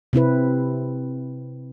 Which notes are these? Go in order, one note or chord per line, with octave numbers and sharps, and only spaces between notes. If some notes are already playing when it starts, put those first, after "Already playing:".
C3 C4 E4 B4